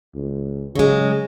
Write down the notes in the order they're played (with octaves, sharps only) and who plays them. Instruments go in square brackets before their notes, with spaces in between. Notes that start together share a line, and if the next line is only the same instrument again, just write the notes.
[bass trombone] C#2
[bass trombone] C#3 [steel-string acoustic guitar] F#3 G#3